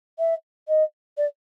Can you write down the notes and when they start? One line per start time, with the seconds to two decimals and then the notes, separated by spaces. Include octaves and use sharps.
0.19 E5
0.68 D#5
1.17 D5